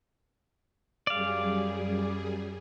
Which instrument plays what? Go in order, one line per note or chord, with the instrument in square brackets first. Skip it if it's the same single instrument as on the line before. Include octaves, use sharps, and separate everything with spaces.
[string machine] F#2 G3 G#4 [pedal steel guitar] D5 F5